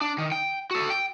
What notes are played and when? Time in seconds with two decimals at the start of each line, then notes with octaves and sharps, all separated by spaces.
0.01 D4
0.18 D#3
0.32 G5
0.71 F#4 A4
0.90 G5